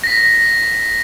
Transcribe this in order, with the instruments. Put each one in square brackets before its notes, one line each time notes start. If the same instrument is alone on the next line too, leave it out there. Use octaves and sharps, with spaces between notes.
[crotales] A#6 B6